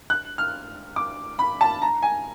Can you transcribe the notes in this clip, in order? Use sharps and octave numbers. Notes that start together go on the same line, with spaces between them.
F#6
F6
D6
B5
A5
A#5
G#5